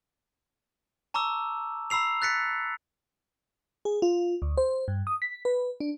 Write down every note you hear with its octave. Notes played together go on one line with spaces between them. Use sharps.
A5 A#5 C#6 D6 E6
A#5 B5 E6 C7 F7
F#6 A6 B6 C#7
G#4
F4
D2
C5
G2
D#6
B6
B4
D4